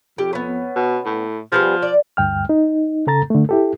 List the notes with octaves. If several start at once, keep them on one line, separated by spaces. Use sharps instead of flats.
F2 G4
B3 C#4
B2
A2
F3 G3 B3 G#4
D5
D2 G2 G5 F6
D#4
C#3 A4 A#5 A6
D3 A3
E4 G4 A4